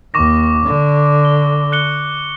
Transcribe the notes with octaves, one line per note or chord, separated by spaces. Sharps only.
D#2 C#6 D6 A#6
D3
G7
F#6 C#7 G7